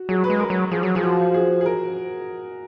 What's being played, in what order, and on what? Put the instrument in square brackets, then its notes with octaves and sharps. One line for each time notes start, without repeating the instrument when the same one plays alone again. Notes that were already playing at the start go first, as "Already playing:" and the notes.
Already playing: [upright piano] F#4
[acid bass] F#3 [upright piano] G#4
[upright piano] B4
[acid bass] G#3
[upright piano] A#4
[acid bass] F#3
[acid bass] F3 [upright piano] G#4
[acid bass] F#3
[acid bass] F3 [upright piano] G#4
[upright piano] F#4
G#4
G#4
A#4